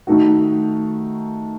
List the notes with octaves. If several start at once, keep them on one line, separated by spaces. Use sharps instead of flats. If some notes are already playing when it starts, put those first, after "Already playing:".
D#3 A3 D#4 F#4